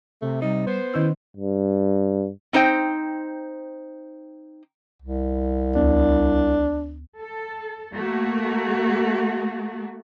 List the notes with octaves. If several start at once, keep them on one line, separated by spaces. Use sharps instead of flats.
C3 A3
C3 G3 D#4
B3 C5
D#3 C#4 E4 E6
G2
C4 D#4 C5 G5
C2
D2 D4
A4
A3 A#3 F#4